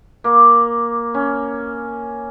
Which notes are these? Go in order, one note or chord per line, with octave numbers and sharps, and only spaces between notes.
A#3
C#4